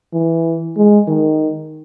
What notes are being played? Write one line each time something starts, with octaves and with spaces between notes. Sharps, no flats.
E3
G#3
D#3